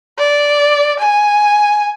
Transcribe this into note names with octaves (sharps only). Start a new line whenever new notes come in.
D5
G#5